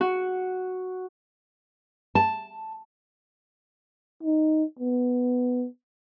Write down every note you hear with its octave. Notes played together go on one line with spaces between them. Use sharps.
F#4
A5
D#4
B3